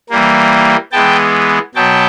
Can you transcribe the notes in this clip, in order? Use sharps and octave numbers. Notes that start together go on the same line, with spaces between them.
E3 G3 A#3
E3 G#3 B3 G5 A5
B2 F#3 B3 G5 A5